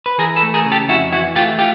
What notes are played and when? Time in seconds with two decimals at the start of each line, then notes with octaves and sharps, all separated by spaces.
0.06 B4
0.18 E3 G#4 A#4
0.36 A4 B4
0.42 A3
0.54 G#4 A#4
0.65 C#3
0.72 G4 A4
0.89 F2 E4 F#4
1.12 E3 E4 F#4
1.35 A3 F4 G4
1.59 F4 G4